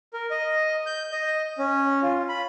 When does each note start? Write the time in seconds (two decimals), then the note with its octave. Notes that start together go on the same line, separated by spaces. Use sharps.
0.14 A#4
0.31 D#5
0.86 G6
1.12 D#5
1.59 C#4
2.02 F4
2.29 B5